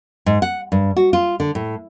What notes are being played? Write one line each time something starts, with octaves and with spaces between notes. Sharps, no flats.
G#2
F#5
G2
F#4
F4
D3
A2